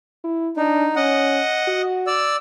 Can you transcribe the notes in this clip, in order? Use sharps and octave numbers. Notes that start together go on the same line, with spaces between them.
E4
D4 D#4
C#4 D#5 F#5
F#4
D5 E6